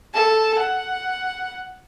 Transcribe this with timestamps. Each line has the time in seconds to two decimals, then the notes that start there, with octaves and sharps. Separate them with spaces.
0.13 A4 A5
0.59 F#5